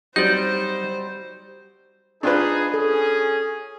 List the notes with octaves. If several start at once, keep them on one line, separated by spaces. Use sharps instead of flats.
F#3 G3 C4 D#4 C5 D5 G6
D4 D#4 F4 G#4 B4
C#4 G#4 A4